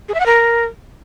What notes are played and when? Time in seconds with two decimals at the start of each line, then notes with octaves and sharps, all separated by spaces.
0.09 G#4
0.14 E5
0.20 F#5
0.26 A#4